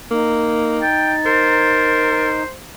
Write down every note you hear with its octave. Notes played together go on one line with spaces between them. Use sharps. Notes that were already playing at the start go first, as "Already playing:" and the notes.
A#3 D#4
G5 A6
A#4 C5